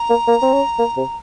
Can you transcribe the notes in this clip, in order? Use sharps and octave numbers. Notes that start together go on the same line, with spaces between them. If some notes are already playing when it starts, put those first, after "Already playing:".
Already playing: A#5
A#3
A#3
C4
C#4
A#3
C3